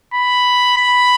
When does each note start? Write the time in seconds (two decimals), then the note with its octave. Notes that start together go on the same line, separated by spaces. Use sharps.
0.14 B5
0.77 B5